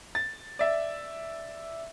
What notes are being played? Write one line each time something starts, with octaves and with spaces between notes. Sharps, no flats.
A6
D5 E5